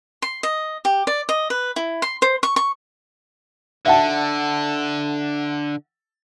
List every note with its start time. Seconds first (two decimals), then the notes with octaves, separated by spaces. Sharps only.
0.22 C6
0.43 D#5
0.85 G4
1.07 D5
1.29 D#5
1.50 B4
1.76 E4
2.02 C6
2.22 C5
2.43 C#6
2.56 C#6
3.86 D3 E5 F#5 A5